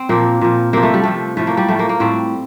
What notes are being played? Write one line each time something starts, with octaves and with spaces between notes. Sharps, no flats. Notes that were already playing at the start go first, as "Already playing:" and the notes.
Already playing: C4
A#2 F3 A#3
A#2 F3
C3 F3 A#3
A3
G3
C3 F3 A3
A2 F3 A3
A#3
G3
A2 F3 A3
A#3
A#3
A2 G3 C4